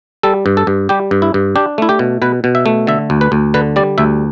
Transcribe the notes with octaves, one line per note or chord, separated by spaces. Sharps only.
G3 A4
G2
A4
G2
G3 G4
G2
E4
G2
D4 G4
A3 E4
G4
B2
B2 B4
B2
E5
A3
D3 E5
D2
B4
D2
D3 B4
G3 D5
D2 E5